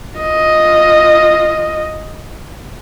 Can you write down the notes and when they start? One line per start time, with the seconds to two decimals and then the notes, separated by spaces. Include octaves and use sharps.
0.17 F4 D#5